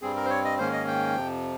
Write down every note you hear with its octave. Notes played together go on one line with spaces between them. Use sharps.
G2 G3 C4 G#4
A#4
C5
C#5
D#5
G#2 D#3 A#3 C#4 C5
D#5
G5
F2 C3 F3